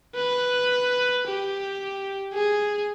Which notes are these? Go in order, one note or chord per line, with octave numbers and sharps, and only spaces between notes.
B4
G4
G#4